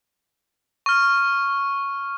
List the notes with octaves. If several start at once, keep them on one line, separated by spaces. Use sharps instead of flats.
C#6 F6